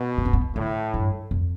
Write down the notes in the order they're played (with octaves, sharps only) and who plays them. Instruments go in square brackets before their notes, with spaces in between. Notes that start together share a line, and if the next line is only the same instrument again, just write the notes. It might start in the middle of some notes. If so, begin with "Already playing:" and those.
Already playing: [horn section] B2
[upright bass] B3
C4
B3
[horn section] A2 [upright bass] D3
[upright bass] G2
F2